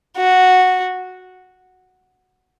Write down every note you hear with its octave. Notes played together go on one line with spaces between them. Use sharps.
F#4